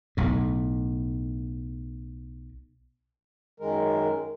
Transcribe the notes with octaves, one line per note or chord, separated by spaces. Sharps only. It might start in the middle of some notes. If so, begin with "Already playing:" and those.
B1 A2
F#2 D#3 G#3 A#4